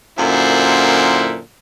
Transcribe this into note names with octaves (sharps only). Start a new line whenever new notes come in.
F#2 A#2 D3 A#3 E4 C5